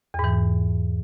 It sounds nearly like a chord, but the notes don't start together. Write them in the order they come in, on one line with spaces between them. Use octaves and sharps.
E2 G#2 E3